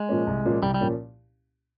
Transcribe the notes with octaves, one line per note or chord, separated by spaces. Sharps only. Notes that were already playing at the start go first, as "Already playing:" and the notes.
Already playing: G#3
A#2 F3 A#3 C#4
C2
A#2 F3 A#3 C#4
C2 G3
G3
A#2 F3 A#3 C#4